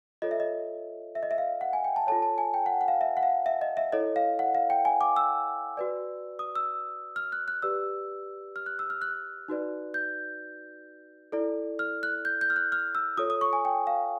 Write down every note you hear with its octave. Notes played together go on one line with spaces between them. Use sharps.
F4 A4 C#5 D#5
E5
D#5
E5
D#5
E5
F5
F#5
G#5
G5
A5
F4 A4 C#5 A5
A5
G#5
G5
F#5
F#5
F5
E5
F#5
F5
E5
D#5
E5
E4 A4 C#5 D#5
F5
F#5
F5
G5
G#5
D6
E6
F#4 B4 D5
D#6
E6
F6
F#6
F#6
G4 B4 D5 E6
F6
F#6
E6
F6
F#6
D#4 F#4 B4 D5
G6
E4 A4 D5
F6
F#6
G6
G6
F6
F#6
F6
E6
F4 A4 C#5 D#6
D#6
C#6
G#5
G5
F5